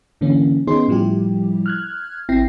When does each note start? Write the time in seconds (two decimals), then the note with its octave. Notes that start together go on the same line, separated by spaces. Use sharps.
0.21 G#2 D3 E3 A#3 C#4
0.67 D#3 B3 C#4 D#4 G#4 C6
0.88 A2 F3 G3 E4 G4
1.66 F6 F#6 G#6
2.29 G#1 C4 E4 G5 A#6 C7